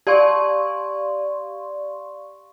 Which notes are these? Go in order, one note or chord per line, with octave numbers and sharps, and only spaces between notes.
G4 D5 F5 C6 C#6